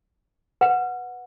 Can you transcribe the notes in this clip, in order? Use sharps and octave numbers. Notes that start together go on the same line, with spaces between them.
B4 F#5